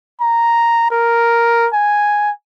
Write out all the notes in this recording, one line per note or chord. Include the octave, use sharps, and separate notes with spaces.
A#5
A#4
G#5